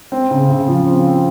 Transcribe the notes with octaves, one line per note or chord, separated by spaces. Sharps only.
C4
C#3
C#3
F3
C4
C4